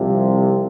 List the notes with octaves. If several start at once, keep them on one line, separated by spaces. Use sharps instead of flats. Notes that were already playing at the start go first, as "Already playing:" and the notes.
Already playing: C2 C3 F3